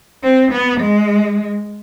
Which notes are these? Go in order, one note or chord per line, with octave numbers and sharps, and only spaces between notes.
C4
B3
G#3